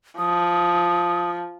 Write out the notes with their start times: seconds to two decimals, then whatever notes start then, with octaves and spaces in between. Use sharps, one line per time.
0.18 F3 D#6